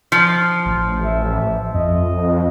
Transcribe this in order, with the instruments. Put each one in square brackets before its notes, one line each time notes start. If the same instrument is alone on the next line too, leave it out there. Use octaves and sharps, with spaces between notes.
[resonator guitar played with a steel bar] F3
[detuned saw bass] A1
[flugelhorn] E5
[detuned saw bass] F2 [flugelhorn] D#5